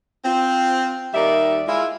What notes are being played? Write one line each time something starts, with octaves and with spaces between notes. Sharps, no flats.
C4 F4
D#2 G3 A#3 D#4 D5 E5
G#3 E4 F4